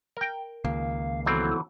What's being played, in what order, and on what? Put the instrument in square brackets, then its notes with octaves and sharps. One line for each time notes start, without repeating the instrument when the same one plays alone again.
[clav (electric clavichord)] A#4 G5
[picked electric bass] C#2 D#3 A#3 [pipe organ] F5
[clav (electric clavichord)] E3 F#3 C4 [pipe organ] B3 E4 A4